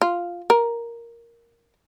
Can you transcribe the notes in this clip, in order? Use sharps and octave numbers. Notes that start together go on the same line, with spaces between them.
F4
A#4